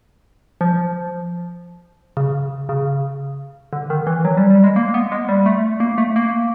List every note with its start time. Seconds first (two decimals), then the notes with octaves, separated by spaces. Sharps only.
0.61 F3
2.17 C#3
2.69 C#3
3.73 D3
3.90 D#3
4.07 E3
4.25 F#3
4.37 G3
4.50 G3
4.64 G#3
4.76 A#3
4.94 B3
5.12 G#3
5.29 G3
5.46 A3
5.80 A#3
5.98 A3
6.16 A#3